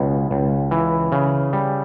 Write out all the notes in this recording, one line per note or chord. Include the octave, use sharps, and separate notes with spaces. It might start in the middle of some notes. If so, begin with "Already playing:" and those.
Already playing: C#2 B2
C#2
E3
C#3
G3